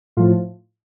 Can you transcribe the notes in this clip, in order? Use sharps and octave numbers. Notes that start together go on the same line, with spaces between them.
A2 F3 F4